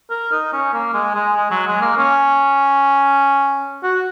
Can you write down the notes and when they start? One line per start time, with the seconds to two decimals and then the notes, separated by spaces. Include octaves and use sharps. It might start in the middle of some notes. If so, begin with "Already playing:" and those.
0.11 A#4
0.32 D#4
0.53 C#4
0.74 A#3
0.94 G#3
1.15 G#3
1.36 G#3
1.51 F#3
1.67 G#3
1.82 A#3
1.97 C#4
3.83 F#4